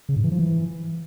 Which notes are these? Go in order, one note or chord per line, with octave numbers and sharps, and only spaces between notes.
C#3
G#2
E3
F3
E3